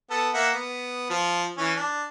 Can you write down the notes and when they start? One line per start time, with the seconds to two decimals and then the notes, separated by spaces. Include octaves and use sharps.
0.10 B3 A4
0.34 A#3 E5 F#5
0.54 B3
1.10 F3
1.58 E3 C#4
1.76 D4